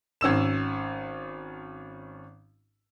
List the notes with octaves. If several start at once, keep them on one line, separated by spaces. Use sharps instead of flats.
G#1 C#4 E6 E7